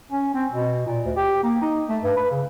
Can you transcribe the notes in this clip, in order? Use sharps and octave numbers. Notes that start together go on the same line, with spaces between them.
C#4
C4
B2
A#2
D2
G4
A#3
D#4
A3
G2
B4
C#3